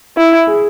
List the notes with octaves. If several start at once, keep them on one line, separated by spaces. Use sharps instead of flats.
E4
G#4